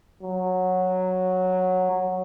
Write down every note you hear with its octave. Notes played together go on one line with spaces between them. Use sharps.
F#3
F#3